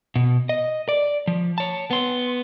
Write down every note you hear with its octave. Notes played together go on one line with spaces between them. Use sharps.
B2
D#5
D5
F3
C#5 A5
B3 C6